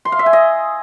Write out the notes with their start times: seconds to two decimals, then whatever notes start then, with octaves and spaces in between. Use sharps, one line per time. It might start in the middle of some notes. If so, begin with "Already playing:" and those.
0.05 C6
0.12 F5
0.19 E5
0.26 G#5
0.33 D#5